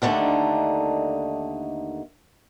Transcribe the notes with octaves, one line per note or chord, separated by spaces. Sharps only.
D#2 D3 A3 A#3 D4 D#4